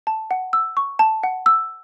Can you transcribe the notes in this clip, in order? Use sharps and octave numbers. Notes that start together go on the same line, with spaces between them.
A5
F#5
E6
C#6
A5
F#5
E6